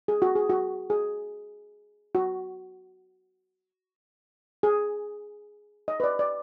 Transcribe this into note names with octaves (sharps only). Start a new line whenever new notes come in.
G#4
F#4
G#4
F#4
G#4
F#4
G#4
D#5
B4
D5
D5